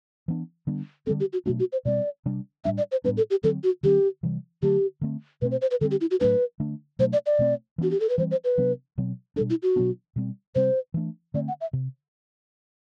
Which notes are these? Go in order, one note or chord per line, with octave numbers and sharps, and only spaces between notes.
E3 B3 D4
D3 G3 B3 D4
D3 G3 C4 A4
G4
F#4
B2 F#3 A3 D4 F#4
F#4
C5
B2 G3 C4 D5
C3 G3 D4
A2 G3 D4 E5
D5
C5
A2 G3 B3 D4 B4
A4
G4
D3 F#3 C4 A4
F#4
D3 F#3 C4 G4
C3 E3 G3
D3 F#3 A3 G4
D3 A3 C4
B2 A3 C4 B4
C5
C5
B4
D3 G3 C4 A4
G4
E4
F#4
A2 F#3 A3 D4 B4
D3 A3 D4
B2 F#3 A3 D4 C5
D5
D5
B2 A3 C4
E3 B3 D4 F#4
G4
A4
B4
E3 G3 C4 C5
C5
B4
C3 F#3 B3 D4
B2 F#3 C4
B2 G3 D4 A4
E4
F#4
B2 F#3 B3 D4
B2 G3 C4
C3 G3 C4 C5
E3 A3 D4
D3 A3 C4 D5
F#5
E5
C3